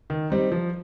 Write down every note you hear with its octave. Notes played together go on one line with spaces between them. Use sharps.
D#3
G3 C4 D#4
F3